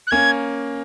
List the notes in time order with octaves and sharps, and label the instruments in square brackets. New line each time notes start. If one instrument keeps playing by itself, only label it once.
[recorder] F#6
[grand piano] A#3 C#4 [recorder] G#6